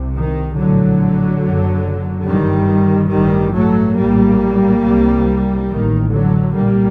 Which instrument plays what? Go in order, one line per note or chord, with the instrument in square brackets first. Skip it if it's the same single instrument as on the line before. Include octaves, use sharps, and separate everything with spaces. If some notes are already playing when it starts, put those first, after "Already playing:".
Already playing: [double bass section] C2 C3
D#3
A#1 A2 D3 F#3
F#1 F#2
G1 G2 D#3 G3
A1 G2 D#3 G3
F#3 A3
A#1 A2 G3 A#3
C2 C3
A1 A2 D#3
D3 F#3
C2 A#2 G3 A#3